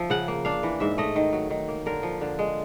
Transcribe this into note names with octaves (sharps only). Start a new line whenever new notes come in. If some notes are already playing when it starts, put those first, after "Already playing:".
Already playing: F3 E5
C#3 F#5
A#3
D4 F5
E3
G#2 E5
A3 D#5
D#3
F#3
D#3
A#3
D3 A#4
F3
D3
G#3